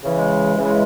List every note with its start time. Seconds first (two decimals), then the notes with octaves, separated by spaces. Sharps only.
0.03 C#3 E3 G#3
0.56 C#3 E3 G#3